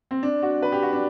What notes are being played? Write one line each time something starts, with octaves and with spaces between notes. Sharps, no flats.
C4
D4
F#4
B4
G4
F#4
D4